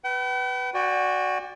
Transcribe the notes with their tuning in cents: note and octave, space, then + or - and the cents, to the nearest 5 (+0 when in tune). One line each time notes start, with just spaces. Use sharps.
B4 +0 G5 -45
F#4 +0 D5 +0 G5 +40